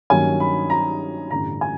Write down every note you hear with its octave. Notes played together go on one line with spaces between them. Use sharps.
G2 D#3 F#3 A#3 C#4 G#5
B5
A#5
A1 G2 D3 G3 A#5
G#5